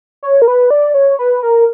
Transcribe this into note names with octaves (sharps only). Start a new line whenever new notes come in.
C#5
A#4
B4
D5
C#5
B4
A#4